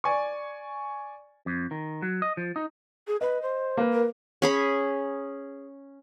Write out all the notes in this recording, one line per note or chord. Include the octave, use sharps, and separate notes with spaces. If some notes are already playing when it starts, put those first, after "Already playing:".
D5 G#5 C#6
F2
D#3
F#3
D#5
F3
D#4
G#4
B4 D#5
C5
A#3 B4
A#4
C#4 G#4 B5